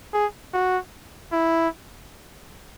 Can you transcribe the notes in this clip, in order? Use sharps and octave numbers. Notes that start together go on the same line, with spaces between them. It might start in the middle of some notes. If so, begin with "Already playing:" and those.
G#4
F#4
E4